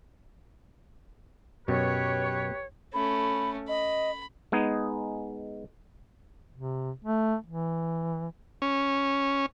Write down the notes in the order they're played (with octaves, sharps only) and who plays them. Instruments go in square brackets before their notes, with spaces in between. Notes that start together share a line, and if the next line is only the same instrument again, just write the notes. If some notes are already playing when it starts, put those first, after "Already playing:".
[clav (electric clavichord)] F#2 B2 [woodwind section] G4 B4 C#5
[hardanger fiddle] A3 C#4 [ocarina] B5
[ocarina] D#5 [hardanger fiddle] B5
[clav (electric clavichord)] G#3 B3 D#4 G#4
[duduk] C3
A3
E3
[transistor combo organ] C#4